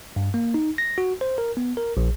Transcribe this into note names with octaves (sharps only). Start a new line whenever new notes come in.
G2
A#3
D#4
A#6
F#4
C5
A#4
B3
A#4
A#1